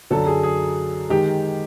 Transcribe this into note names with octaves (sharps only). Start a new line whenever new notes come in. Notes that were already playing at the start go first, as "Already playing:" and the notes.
F#2 D3 F#3 A4
G#4
G#4
D#3 G#3 G4